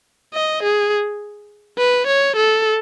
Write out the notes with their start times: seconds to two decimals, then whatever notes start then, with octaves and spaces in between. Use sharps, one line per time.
0.34 D#5
0.63 G#4
1.78 B4
2.07 C#5
2.37 A4